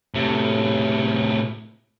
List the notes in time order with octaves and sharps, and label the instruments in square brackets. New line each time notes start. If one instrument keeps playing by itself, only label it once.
[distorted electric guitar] A2 C3